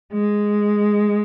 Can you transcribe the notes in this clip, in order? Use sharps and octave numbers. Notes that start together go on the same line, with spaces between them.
G#3